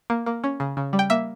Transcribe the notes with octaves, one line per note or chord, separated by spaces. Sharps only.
A#3
A#3
C#4
C#3
C#3
G3
G5
A#3 E5